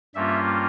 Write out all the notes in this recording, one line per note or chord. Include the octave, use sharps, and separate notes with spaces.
G2 G3 A#3 C#4 F4 E5